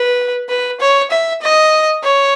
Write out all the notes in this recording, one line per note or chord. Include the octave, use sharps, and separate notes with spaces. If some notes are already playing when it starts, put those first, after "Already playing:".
Already playing: B4
B4
C#5
E5
D#5
C#5